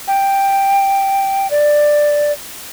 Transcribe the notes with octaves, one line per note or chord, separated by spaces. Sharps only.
G5
D5